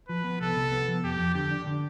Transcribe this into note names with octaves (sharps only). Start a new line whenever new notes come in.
F3 B4
B3
C2 A4
C2
B3
F3
F2 G4
F2
D3 G4
D4
D3